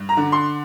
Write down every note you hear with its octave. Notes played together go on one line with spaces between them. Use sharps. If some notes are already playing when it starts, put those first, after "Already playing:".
Already playing: G2
A#5
D3
C6